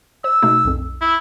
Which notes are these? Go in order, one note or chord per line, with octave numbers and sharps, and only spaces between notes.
C5 E6
B2 A3 D#4
B1 F2
E4